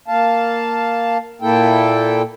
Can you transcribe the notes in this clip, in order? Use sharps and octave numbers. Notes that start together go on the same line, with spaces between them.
A#3 F5 A5
A#2 A#3 E4 A4 G5